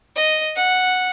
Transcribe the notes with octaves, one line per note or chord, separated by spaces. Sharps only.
D#5
F#5